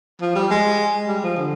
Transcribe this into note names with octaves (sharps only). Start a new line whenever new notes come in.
F3
G3
G#3
G3
F3
D3